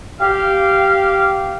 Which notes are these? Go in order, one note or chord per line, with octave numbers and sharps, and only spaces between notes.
G4 F5